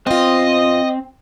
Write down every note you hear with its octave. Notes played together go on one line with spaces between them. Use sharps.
E2 C4 F4 D#5